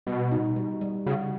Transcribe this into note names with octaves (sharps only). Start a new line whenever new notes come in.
B2 G3
D#4
G3
G3
C#3 F#4